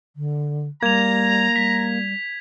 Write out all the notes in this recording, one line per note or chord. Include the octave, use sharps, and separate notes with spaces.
D3
G3 A#3 A#5 G#6 F7
G3 B6